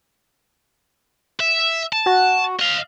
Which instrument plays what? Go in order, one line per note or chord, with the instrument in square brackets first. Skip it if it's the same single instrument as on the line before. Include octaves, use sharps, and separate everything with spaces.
[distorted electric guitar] E5
A5
[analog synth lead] F#4
[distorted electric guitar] D#5 F5